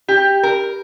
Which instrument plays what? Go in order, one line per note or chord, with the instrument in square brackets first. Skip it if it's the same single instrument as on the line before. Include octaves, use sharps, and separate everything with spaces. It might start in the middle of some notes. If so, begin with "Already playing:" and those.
[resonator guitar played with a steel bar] G4
A#4